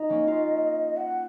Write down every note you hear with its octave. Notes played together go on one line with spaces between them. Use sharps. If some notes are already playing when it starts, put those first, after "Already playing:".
Already playing: D#4 D#5
A#3 C#4
C#4 F4
F#5